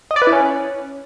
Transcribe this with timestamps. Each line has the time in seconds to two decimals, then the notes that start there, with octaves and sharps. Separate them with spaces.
0.11 D#5
0.16 D5
0.22 B4
0.27 E4
0.33 C#4